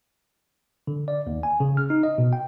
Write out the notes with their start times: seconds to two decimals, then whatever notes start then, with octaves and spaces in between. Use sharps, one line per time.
0.87 D3
1.08 D5
1.27 D#2
1.43 G#5
1.60 C#3
1.77 F6
1.90 D#4
2.03 D#5
2.18 B2
2.33 G5